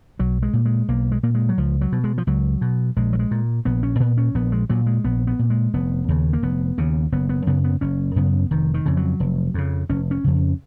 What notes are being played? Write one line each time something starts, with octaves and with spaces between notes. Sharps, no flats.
B1 F#3
G#3
A#2
G#3
B1 A#3
G#3
A#2 A#3
G#3
F#3
C#2 F3
F#3
B2
G#3
F3
C#2 F#3
B2
A#1 G#3
F#3
G#3
A#2
A#1 B3
C#4
A#2 B3
C#4
A#1 B3
G#3
A#2 F#3
G#3
A#1 B3
B3
A#2
G#3
F1 B3
D#2 C#3
A#3
F1 B3
D#2 C#3
F#1 B3
B3
F#2 C#3 B3
B3
F#1 C#4
F#2 C#3 B3
F1 D#3
D#3
F2 C#3
F#3
F1
F2 C#3
F1 C#4
C#4
F2 C#3